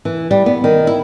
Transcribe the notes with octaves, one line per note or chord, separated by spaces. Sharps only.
E3
G3
B3
D#3
E4